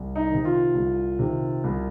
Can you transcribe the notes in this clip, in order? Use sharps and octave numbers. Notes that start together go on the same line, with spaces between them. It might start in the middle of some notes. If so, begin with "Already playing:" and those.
Already playing: C2
D#4
C3 D#3
F4
C2
C3 D#3
C2